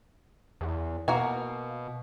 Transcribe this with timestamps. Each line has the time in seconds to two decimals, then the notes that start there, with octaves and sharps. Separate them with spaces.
0.61 E2
1.08 B2 A#3 F#4 G#5